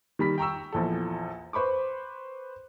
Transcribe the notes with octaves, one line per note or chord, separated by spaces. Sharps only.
D#3 G3 B5 B6
G5 A#5 C#6 E6
A#1 E2 A4
B4 C5 B5 C#6 D6